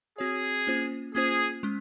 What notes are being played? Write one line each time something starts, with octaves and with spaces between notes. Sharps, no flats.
C4 F#4 G#4 C#5
A#3 C#4 F4 C5
A#3 C#4 F4 G#4 C5
G#3 C#4